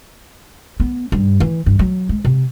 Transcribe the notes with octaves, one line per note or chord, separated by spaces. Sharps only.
B3
G2
E3
G2
F#3
G#3
C3